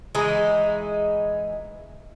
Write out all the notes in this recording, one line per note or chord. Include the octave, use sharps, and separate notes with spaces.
E3 G#3 D#4 E4